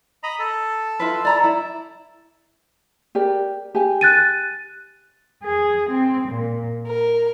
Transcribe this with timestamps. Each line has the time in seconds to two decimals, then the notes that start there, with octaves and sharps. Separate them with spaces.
0.23 D#5 A#5 B5
0.39 A4
1.00 E4 F4 B4
1.25 D5 A#5 B5
1.44 E4
3.15 G4 A#4 D5
3.75 G4 G#5
4.01 F#6 A6 D#7
5.44 G#4
5.90 C4
6.28 A#2
6.86 A#4